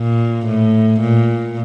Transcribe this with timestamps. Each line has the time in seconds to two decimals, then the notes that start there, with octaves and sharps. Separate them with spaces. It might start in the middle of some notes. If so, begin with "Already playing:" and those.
Already playing: A#2
0.47 A2
1.01 A#2